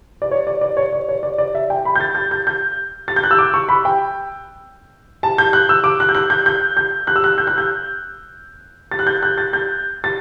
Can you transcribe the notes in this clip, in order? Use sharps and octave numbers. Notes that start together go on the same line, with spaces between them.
D5
C#5
D5
D5
C#5
D5
C#5
D5
D5
E5
G5
B5
G6
A6
A6
G6
G6
A6
G6
F#6
E6
D6
C#6
B5
G5
A5
G6
F#6
E6
D6
F#6
G6
F#6
G6
G6
G6
F#6
E6
F#6
G6
F#6
G6
A6
F#6
G6
F#6
A6
G6
A6